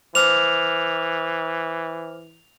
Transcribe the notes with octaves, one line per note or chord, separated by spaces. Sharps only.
E3 C5 D6 F6 F7